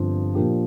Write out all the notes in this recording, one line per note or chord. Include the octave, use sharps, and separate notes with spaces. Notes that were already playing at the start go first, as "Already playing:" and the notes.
Already playing: G1 G2 F3 C4
A#2 F3 D4 G4 A#4